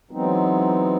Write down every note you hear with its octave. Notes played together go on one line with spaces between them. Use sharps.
E3 F#3 G#3 B3 C4 D#4